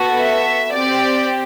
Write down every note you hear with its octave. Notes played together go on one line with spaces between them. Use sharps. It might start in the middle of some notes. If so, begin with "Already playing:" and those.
Already playing: B3 F#4 A4
E5
C4 G4 D5